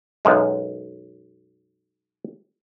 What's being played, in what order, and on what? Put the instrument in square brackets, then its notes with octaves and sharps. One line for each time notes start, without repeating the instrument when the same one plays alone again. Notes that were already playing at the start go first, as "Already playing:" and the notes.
[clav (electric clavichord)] B1 F#2 G#3